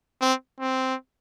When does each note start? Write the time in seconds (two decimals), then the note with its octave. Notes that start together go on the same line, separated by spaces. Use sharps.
0.22 C4
0.60 C4